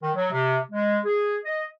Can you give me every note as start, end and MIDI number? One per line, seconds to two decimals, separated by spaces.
0.02 0.10 51
0.15 0.30 54
0.32 0.58 48
0.71 0.98 56
1.05 1.36 68
1.44 1.64 75